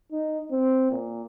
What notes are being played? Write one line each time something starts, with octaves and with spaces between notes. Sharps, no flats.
D#4
C4
A#2